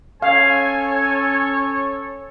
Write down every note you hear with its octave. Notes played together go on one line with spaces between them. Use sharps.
C#4 A4 C#5 F5 G#5